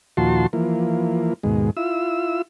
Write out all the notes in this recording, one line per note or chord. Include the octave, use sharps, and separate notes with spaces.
D#2 A#2 F3 F#4 A5 C6
E3 F3 A#3
D#2 G#2 B2 G#3
E4 F4 E6